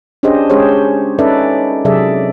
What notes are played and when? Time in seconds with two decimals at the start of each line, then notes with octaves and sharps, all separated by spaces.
0.23 C#4 D4 G4 G#4 C5 D#5
0.50 G#3 C#4 G4 G#4 C5 C#5
1.19 C#4 D#4 A4 B4 D5 E5
1.85 C3 F#3 G#4 A4 D5 E5